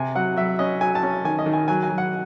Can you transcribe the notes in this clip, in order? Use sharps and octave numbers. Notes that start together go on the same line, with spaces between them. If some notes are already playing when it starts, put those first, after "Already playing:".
Already playing: C3 G#5
F#3 F#5
F#3 E5
C#4 D#5
F#3 G#5
A5
C#4
D#3 G#5
D#5
D#3
G#5
F#3 G#5
G#5
F#3
F#5